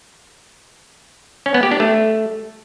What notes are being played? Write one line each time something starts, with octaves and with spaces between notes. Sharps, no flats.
C#4
B3
G4
D4
A3